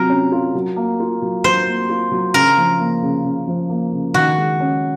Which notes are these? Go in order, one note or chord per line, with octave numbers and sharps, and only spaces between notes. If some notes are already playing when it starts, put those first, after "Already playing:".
Already playing: C3 F#3 F4 A#4
C#4
F4
F#3
A#3
F4
F#3
F#3 C5
A#3
F4
F#3
C#3 A#4
F3
A#3
C#3
C#3
F3
A#3
C#3
D#3 F#4
G#3
C#4